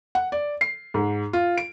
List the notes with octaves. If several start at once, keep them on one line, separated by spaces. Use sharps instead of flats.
F#5
D5
C7
G#2
F4
D7